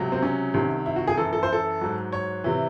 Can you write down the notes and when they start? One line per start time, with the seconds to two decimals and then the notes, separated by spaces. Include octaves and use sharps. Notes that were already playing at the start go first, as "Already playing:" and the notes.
Already playing: C#2 C3 F#3
0.12 C4
0.22 C#4
0.54 C2 C3 D#3
0.86 E4
0.96 F#4
1.07 G#4
1.18 F#2 E3 A4
1.33 A4
1.43 C5
1.53 A4
1.81 G#2 F#3
2.12 C#5
2.44 C3 E3